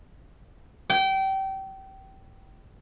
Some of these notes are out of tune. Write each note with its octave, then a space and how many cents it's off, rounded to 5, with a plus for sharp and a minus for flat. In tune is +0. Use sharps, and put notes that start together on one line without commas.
G5 -25